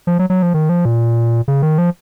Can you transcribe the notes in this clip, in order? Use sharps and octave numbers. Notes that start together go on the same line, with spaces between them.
F3
F#3
F#3
F3
D#3
F3
A#2
C#3
D#3
F3